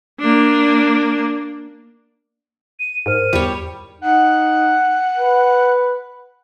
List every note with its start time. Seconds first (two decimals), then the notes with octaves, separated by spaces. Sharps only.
0.20 A#3 D4
2.80 D#7
3.06 G#2 A#4 C5 F6 D#7
3.33 E2 G3 C#5
4.01 D#4 F#5
5.16 B4